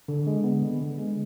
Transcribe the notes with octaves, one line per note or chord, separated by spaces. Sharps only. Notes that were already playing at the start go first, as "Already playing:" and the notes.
D3
G#3
B3
D3
D3
G#3